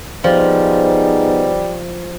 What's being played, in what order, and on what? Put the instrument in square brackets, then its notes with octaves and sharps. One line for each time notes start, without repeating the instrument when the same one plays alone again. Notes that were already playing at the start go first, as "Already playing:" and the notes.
[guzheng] F3 [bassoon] G3 [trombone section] B3 D#4 G#4 [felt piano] C5